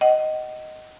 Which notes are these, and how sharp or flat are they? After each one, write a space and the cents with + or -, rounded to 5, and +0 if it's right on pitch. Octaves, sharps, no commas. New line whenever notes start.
D#5 +0 F#5 +35